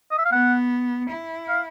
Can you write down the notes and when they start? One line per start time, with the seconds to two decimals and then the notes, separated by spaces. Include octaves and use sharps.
0.11 D#5
0.18 E5
0.25 F5
0.32 B3 F#5
1.10 E4
1.49 F5